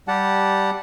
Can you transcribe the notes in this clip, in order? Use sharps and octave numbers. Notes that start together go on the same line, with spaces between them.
G3 G4 F#5 A5